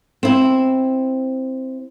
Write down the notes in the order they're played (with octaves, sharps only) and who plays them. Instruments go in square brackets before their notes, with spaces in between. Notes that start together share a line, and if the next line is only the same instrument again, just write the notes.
[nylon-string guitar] C4 E4